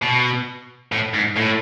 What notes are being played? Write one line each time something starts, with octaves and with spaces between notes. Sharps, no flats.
B2
A2
G#2
A2